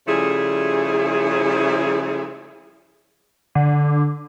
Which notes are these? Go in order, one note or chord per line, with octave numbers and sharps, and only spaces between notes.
C#3 F3 G3 A3 E4 G#4
D3